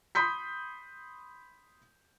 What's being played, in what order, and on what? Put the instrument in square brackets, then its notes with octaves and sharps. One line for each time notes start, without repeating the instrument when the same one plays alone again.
[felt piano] B5 C6 D#6 G6 B6